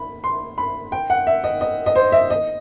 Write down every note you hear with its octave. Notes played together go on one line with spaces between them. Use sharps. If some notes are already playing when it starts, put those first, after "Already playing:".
Already playing: B5
C6
B5
G5
F#5
E5
D#5
D#5
D#5
C5
E5
D#5